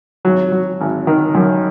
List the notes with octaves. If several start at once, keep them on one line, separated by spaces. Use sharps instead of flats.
G#1 F#3
F#3
G#1
D#3
F#2